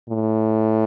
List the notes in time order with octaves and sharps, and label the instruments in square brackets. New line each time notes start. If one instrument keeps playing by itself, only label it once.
[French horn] A2